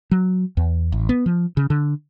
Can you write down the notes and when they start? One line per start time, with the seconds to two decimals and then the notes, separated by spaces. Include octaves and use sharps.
0.11 F#3
0.57 E2
0.92 A1
1.09 B3
1.26 F3
1.57 C#3
1.70 D3